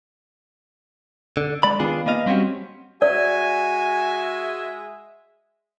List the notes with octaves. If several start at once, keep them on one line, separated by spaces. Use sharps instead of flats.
D3
G#3 D5 B5
D#3 B3 D4 F4 G#4
A#3 B3 D#5 F5
G3 C4 C#4 F#4 G4
G#3 F#4 D5 E5 G#5